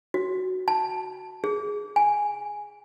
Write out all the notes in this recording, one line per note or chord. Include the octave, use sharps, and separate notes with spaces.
F#4
A5
G#4
G#5